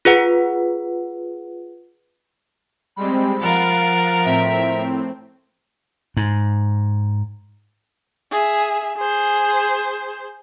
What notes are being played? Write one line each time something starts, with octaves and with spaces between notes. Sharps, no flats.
F4 G#4 B4 F#5
G3 G#3 C4 B5
F3 A#4 F5 F#5 A6
A2 C4 E5
G#2
G#4 E5
G#4 C5